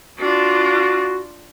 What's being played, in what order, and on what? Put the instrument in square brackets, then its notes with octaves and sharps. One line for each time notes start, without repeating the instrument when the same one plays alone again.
[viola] D4 F4 [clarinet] F#4